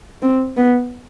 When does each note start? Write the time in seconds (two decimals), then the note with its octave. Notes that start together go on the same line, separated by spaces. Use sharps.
0.22 C4
0.57 B3